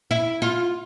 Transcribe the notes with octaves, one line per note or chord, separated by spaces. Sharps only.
E4
F4